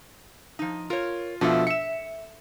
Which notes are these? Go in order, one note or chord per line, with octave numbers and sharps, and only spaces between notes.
F3 D#4
F4 A#4 C#5
B2 F3 D4 F4 A4 E5
E5 C#7 E7